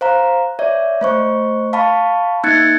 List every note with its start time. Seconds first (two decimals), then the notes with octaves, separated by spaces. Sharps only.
0.01 C5 F5 A#5
0.59 C#5 D5 E5
1.01 A3 C5 C#6
1.73 F5 A5 B5 C#6
2.43 A#3 D#4 F#6 G#6 A6 C#7